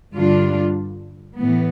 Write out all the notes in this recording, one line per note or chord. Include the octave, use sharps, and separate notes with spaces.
G2 D3 G3 D4 F4
A2 E3 B3